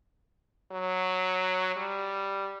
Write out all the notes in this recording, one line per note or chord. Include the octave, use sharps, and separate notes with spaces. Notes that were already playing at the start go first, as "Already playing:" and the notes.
F#3
G3